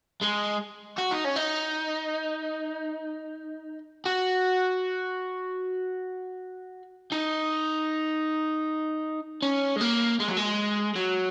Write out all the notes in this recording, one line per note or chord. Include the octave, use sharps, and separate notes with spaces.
G#3
F#4
D#4
C#4
D#4
F#4
D#4
C#4
G#3
A#3
G#3
F#3
G#3
F#3